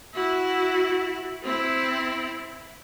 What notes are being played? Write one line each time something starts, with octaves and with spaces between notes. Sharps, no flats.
E4 F#4
C4 E4